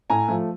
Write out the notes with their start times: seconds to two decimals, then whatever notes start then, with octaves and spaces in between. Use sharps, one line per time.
0.10 A2 G#5 A#5
0.28 F3 A3